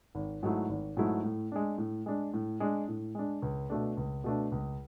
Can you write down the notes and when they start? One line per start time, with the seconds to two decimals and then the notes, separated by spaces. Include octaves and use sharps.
0.15 G#1
0.43 G#2 F#3 A3 E4
0.69 G#1
0.97 G#2 F#3 A3 E4
1.24 A2
1.52 G#3 D4
1.78 A2
2.06 G#3 D4
2.34 A2
2.60 G#3 D4
2.88 A2
3.15 G#3 D4
3.42 C#2
3.70 B2 A3 D4
3.97 C#2
4.24 B2 A3 D4
4.52 C#2